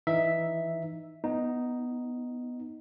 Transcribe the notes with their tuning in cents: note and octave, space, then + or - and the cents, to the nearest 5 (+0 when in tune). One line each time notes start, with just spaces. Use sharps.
E3 +0 D#4 +0 E5 +0
B3 +0 D#4 +0